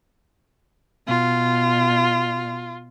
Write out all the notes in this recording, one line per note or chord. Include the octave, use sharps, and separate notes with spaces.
B2 F4